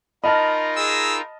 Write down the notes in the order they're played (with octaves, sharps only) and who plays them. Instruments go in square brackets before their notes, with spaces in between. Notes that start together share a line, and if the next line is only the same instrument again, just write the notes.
[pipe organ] D#4 F4 A#4 [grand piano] D#5 A5 F6 [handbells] B5
[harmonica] G#4 E6